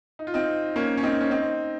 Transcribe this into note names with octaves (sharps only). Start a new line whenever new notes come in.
D#4
F4
C4 D#4
A#3 C#4
C#4
C4 D#4
C#4
C4 D#4